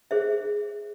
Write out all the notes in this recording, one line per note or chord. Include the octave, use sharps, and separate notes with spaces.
G#4 C5 E5